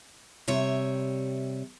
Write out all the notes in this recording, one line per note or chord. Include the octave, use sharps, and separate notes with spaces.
C3 G3 C#5 E5